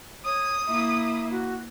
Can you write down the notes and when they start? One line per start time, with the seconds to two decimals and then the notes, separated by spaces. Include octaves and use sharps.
0.25 C#5 D#6
0.66 A#3 E4 E5
1.30 F#4